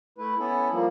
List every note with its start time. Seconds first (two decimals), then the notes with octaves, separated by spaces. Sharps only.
0.18 A3 E4 B4
0.39 B3 C#4 E4 A4
0.71 F3 G3 A#3